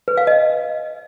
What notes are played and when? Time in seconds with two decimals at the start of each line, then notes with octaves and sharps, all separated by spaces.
0.08 B4
0.17 F5
0.27 D#5